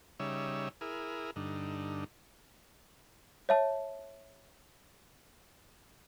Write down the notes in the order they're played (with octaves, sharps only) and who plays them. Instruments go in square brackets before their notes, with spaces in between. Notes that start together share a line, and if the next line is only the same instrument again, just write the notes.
[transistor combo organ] C#3 G3 D#4 C#5 E5
E4 G#4 A#4
G2 D3 D#4
[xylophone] C#5 E5 A5